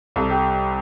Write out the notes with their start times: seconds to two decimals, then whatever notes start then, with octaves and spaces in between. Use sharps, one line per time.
0.16 C2 A4
0.30 G4